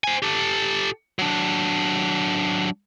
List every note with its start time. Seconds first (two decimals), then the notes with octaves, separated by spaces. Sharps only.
0.04 C5 G#5
0.23 G4 A4
1.19 F#3 D4